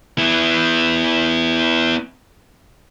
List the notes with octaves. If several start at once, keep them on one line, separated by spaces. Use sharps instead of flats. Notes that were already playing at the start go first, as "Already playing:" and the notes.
B3 E4